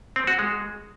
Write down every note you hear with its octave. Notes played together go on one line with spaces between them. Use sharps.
C4
F#4
G#3